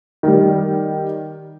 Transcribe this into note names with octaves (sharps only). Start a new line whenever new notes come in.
D#3 G3